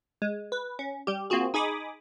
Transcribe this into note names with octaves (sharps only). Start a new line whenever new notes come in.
G#3
B4
C#4
G3 G4
A#3 C4 F4 F#4 G#4
D#4 G#4 G#5 B5 D6 D#6